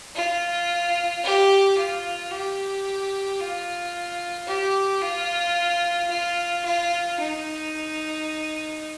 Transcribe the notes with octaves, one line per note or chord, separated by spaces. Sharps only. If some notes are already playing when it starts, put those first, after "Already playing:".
F4
G4
F4
G4
F4
G4
F4
F4
F4
D#4